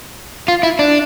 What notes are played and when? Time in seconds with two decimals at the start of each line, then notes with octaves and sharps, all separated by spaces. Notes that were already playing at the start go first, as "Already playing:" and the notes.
0.48 F4
0.63 E4
0.79 D4